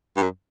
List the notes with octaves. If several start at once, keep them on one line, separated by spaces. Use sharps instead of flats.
G2
F#2